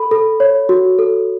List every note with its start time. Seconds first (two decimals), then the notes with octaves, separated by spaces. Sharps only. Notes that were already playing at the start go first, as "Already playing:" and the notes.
Already playing: A4 B5
0.11 A4
0.40 C#5
0.69 F#4
0.99 A4